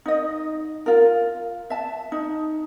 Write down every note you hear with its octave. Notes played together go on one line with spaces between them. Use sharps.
D#4 D#5
F4 A#4
E5 A5
D#4